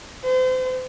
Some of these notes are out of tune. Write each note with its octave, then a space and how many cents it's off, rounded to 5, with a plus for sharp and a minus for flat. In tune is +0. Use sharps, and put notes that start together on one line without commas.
C5 -35